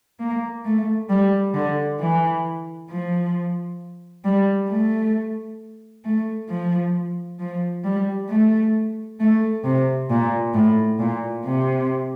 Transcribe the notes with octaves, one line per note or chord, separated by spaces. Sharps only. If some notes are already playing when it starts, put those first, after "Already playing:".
A#3
A3
G3
D3
E3
F3
G3
A3
A3
F3
F3
G3
A3
A3
C3
A#2
A2
A#2
C3